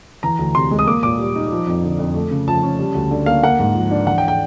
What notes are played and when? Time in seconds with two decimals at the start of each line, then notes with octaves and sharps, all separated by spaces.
0.23 E3 A#5
0.39 D2
0.55 C3 C6
0.71 G#3
0.79 D#6
0.87 A#3 D6
1.03 A#2 D6
1.19 G3
1.36 D#4
1.52 F3
1.67 F2
1.83 D3
1.99 F2
2.15 A3
2.31 C#3
2.48 F3 A5
2.63 C#4
2.79 G3
2.95 D2
3.11 D3
3.26 A#3 F5
3.43 A#3 F#5
3.59 G#2
3.75 F3
3.91 D4
4.07 E3 F#5
4.18 G5
4.28 G5